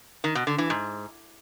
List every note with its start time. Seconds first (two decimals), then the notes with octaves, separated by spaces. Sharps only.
0.24 D#3
0.35 B2
0.47 D3
0.58 E3
0.70 G#2